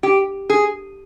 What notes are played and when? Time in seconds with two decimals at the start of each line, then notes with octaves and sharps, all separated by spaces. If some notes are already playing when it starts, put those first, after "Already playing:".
0.03 G4
0.50 G#4